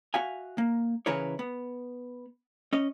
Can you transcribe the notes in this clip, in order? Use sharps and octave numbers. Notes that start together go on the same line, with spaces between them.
F#4 E5 F5 G#5
A#3
C#3 E3 E4 A#4 B4 C#5
B3
C#4 D#5